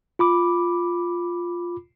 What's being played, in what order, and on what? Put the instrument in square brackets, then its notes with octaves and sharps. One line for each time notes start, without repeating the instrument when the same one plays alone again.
[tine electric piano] F4 B5 D6